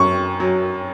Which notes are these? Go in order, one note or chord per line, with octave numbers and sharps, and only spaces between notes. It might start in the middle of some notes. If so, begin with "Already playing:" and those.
Already playing: F#2 C#6
F#3